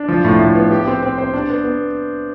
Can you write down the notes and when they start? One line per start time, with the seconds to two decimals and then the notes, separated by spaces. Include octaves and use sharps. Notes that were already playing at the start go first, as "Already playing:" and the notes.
Already playing: D4
0.08 F3
0.25 A2
0.39 A2
0.55 B3
0.71 G4
0.87 C4
1.03 C4
1.18 C5
1.34 D4
1.50 B3
1.65 B3